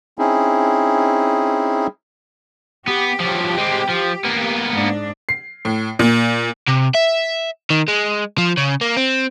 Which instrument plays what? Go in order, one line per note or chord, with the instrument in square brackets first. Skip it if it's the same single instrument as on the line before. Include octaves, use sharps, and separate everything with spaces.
[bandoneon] C4 C#4 D#4 E4 G#4
[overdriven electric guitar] B3 [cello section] G4
[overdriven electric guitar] F3 F#3
G#3 C4
F3
A#3 B3
[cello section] G#2 D4
[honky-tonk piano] C7
A2
A#2
[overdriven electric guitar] C3
E5
D#3
G#3
F3
C#3
A#3
C4